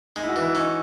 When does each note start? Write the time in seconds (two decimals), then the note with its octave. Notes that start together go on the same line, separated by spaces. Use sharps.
0.16 G#3 D#4
0.23 E4
0.29 F#4
0.36 E3
0.42 E4
0.55 C#4 D#4